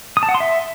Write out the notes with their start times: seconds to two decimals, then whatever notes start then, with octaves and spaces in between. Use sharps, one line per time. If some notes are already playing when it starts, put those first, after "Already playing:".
0.17 D#6
0.23 A5
0.29 F#5
0.35 C6
0.40 E5